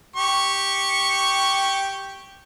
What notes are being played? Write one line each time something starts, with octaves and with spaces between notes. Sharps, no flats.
G4 C#6